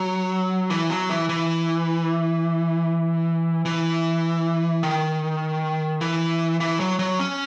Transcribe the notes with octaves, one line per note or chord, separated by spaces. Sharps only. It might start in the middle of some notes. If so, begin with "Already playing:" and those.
Already playing: F#3
E3
F#3
E3
E3
E3
D#3
E3
E3
F#3
F#3
C#4